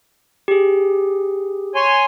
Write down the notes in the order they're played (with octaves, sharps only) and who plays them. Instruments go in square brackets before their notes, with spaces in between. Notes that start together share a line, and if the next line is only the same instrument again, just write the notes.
[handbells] G4 G#4
[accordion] C#5 G#5 C6